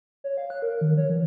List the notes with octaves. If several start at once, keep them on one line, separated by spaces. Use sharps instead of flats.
C#5
F5
F#6
A#4
D#3
C#5
E3